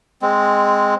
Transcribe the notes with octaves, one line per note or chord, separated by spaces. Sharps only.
G#3 C4